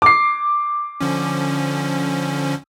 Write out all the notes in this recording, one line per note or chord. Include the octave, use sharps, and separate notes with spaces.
D6 C7
D3 F3 C#4